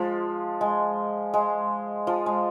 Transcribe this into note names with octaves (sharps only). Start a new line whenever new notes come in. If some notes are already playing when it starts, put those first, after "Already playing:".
Already playing: F3 G#3
G#3
G#3
F3
G#3